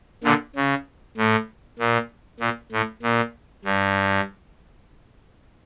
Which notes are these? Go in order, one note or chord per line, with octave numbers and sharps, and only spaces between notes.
A#2 D3
C#3
A2
A#2
A#2
A2
A#2
G2